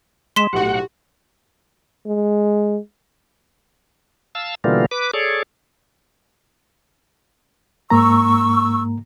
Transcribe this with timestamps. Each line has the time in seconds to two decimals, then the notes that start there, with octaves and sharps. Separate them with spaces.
0.36 G#3 C6 B6 E7
0.53 B1 A2 F#4 G4 F#5
2.06 G#3
4.35 F5 A5 E6
4.64 B2 D3 E3 G3 A#3 F4
4.91 B4 D6
5.14 G#4 A4 C#5 D5
7.90 G#2 A#3 A#5 C#6 E6